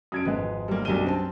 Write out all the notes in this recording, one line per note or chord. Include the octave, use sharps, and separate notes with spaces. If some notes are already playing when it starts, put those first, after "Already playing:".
F#2 D#6 G#6 D7
G#1 F2 G#3 B4
G3 A#3
B1 F#2 G3 D4 D#7 G7
C4 A5